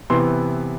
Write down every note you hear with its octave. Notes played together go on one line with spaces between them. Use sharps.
C3 E3 B3 C6